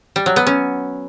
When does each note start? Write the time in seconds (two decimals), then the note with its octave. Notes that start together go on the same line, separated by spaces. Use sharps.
0.16 G3
0.26 F#3
0.36 B3
0.47 C#4